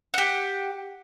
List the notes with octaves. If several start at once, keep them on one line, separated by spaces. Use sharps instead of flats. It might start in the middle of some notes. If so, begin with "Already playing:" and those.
G4 F#5